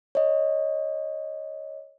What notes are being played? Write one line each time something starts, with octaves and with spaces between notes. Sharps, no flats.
C#5 D#5